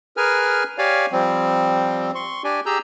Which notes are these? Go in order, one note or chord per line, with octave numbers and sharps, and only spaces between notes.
G#4 A#4 B4 G#5 F6
G4 C#5 D5 F5 G#5
F3 G3 C4
C6 C#6
D4 G4 D5 G#5
G4 G#4 A#5 E6 G6